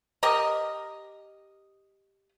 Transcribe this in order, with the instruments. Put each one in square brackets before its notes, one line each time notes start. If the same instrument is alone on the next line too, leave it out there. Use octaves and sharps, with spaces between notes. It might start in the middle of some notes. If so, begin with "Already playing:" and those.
[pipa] G4 A#4 D#5